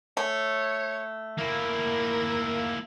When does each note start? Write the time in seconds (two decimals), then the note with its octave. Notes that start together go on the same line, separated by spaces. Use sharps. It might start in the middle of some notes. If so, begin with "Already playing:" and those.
0.17 A3 C#5
1.38 A#3 E4 A#4